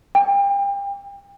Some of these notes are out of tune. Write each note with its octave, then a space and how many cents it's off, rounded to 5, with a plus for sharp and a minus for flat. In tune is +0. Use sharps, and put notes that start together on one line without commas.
G5 +35